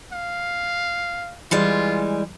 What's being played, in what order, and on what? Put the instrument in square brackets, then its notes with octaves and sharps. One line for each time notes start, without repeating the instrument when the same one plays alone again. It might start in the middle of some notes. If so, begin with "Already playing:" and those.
[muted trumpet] F5
[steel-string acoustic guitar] E3 G3 G#3 [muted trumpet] F4